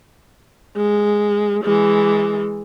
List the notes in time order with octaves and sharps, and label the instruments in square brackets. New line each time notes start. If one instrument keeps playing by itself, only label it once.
[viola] G#3
E3 G#3